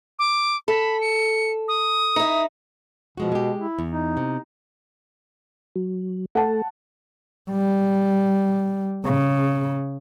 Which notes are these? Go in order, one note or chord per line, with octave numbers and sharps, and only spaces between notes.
D6
A4 B5
C#7
D#6
D#4 E4
B2 F3 G#3 F#4
G#3 G4
E4
E2
D#4
C3
F#3
A3 A4 F#5 A5
G3
C#3